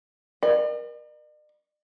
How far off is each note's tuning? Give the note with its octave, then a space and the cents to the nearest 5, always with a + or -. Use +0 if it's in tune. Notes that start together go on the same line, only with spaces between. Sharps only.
A#4 +35 D5 +45